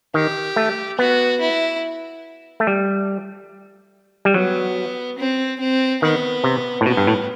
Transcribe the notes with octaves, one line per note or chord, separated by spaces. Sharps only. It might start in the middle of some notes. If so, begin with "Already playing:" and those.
D#3 G4
A3
B3 F#4
E4
A3
G3
G3
F#3 B3
C4
C4
D#3 B3
C3
A2
B2 B3
G2
A2